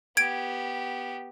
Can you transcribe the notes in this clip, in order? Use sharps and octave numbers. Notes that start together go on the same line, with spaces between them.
B3 G4 G#6 D7